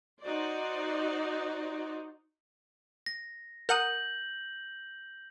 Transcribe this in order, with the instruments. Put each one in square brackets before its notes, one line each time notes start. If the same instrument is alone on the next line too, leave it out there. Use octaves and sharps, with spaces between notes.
[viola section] D#4 F#4 C5 D5
[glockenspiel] A#6
[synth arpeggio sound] A#4 F#5 D#6 [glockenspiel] G6 F#7